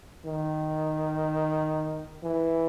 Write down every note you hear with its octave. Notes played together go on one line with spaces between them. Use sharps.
D#3
E3